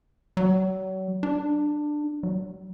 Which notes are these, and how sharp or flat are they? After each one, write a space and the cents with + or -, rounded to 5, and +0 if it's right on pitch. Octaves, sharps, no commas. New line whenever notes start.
F#3 +35
D4 +15
F#3 +40